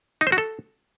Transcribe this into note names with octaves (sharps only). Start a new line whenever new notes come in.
D#4
C5
F#4
A4